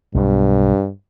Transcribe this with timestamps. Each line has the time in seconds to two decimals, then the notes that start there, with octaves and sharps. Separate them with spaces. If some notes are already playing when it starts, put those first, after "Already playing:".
0.14 B1 G2 B2 G3